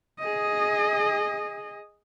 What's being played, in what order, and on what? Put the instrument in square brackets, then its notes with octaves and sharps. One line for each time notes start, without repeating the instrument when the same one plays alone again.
[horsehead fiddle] G#4 D#5